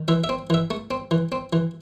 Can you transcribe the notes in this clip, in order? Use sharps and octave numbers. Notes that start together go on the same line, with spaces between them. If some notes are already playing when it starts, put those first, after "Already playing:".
Already playing: D#3
E3 E5
E5
C4
E3 E5
A3
C4
E3
C4
E3